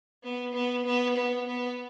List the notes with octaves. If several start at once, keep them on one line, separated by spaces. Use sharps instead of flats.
B3
B3
B3
B3
B3